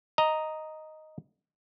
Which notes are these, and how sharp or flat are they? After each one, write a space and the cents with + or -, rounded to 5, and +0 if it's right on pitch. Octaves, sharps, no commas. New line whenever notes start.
D#5 +0 A#5 +0